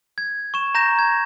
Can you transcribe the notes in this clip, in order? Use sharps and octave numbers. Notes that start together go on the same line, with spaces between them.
G#6
C#6 E7
A#5 G6 A#6 E7
G#6